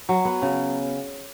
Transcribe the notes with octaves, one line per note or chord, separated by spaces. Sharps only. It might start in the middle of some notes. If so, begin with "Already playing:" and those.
F#3
B3
C#3